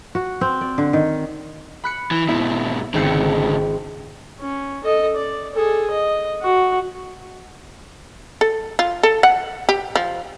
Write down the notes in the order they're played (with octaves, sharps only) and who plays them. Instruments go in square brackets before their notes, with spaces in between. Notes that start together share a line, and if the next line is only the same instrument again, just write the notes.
[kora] F#4
C4
D5
D3
D#3
[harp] B5 F#6 C#7
[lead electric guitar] E3
[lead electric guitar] G#2 B2 [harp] E4 E5
[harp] G#1 C4 C#7 [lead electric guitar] D2 C#3
[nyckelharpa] C#4
A4 D#5
D5
G#4 A4
D#5
F#4
[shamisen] A4
F4
A4
F#5
G4
F3